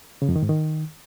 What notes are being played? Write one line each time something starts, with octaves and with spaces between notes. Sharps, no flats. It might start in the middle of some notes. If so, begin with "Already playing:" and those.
C#3
F2
D#3
G#2
D#3